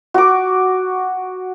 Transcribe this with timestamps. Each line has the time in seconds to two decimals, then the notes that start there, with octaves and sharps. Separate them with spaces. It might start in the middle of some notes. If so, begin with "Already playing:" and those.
0.14 F#4 D6